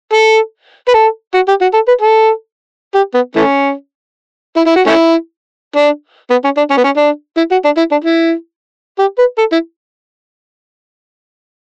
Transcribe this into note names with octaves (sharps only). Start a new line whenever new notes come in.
A4
B4
A4
F#4
G4
F#4
A4
B4
A4
G4
B3
E3 A3 C#4
E4
E4
F#4
A3 C#4 E4
D4
B3
C#4
D4
C#4
B3
C#4
D4
E4
F#4
D4
E4
D4
E4
G4
B4
A4
E4